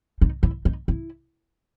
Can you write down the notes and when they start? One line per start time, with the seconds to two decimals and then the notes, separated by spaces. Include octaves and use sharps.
0.21 D#4
0.43 E4
0.65 D#4
0.88 E4